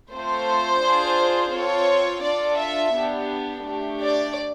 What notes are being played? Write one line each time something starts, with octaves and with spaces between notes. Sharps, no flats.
A3 C4 F4 A4 C5
D4 F4 G#4
C4 F4 A4 C#5
D4 F4 A4 D5
E5
B3 D4 G4
A3 D4 G4
D5